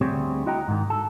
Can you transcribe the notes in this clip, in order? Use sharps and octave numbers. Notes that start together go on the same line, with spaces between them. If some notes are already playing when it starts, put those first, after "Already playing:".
D2 G3 C4 G#4 C#5
E4 F#4 D#5 G5 A#5
G#2 D#3
A4